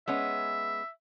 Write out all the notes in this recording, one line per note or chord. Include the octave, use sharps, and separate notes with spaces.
G#3 B3 C#4 E5